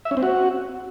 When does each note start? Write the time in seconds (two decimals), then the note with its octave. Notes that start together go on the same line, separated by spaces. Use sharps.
0.05 E5
0.11 C#4
0.17 C4
0.23 F#4